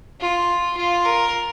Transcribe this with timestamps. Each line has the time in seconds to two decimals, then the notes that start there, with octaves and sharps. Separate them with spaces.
0.20 F4
0.77 F4
1.05 A#4